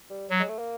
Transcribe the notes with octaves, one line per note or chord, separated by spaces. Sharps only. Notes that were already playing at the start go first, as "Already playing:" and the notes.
G3
F#3
G#3
A3
A#3